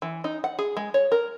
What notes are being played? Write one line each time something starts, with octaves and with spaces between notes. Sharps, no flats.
E3
D#4
F#5
G#4
G#3
C#5
A#4